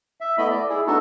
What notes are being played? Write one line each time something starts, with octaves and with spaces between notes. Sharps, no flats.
E5
A3 B3 E4 D#5 B5
D5
E4 G#4
A3 B3 D4 D#4 F#4 A4